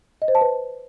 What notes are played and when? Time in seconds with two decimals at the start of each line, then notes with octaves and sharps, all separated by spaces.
0.22 D#5
0.28 C5
0.35 A5
0.41 B4